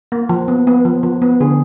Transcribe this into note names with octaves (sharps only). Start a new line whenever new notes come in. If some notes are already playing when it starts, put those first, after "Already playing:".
A#3
F3
B3
B3
F3
F3
B3
D3 G#4